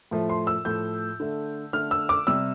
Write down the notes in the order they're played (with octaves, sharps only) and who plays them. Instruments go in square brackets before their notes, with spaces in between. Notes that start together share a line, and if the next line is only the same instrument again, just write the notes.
[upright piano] A2 F3 A3
C6
E6
A2 F3 A3 G6
D3 A3
D3 A3 F6
E6
D6
C3 G3 E6